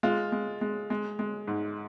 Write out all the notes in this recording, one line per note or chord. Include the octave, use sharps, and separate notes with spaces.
G#3 F4
G#3
G#3
G#3
G#3
G#2